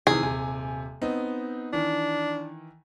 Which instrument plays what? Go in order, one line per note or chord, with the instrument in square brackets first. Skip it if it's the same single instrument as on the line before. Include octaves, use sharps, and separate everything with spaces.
[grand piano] C3 D#3 E3 [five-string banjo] G#4
[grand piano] D#1 C3 G#5
B3 C4 D#4
[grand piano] D#3 E3 [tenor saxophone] D4